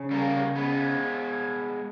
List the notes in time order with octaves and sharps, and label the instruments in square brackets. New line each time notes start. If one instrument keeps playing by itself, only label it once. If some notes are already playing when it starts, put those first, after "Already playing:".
Already playing: [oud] C#3
[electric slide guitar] G3 A#3
G#3 B3